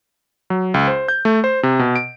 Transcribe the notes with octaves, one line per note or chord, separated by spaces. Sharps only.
F#3
C#2
C5
G6
A3
C5
C3
B2
D7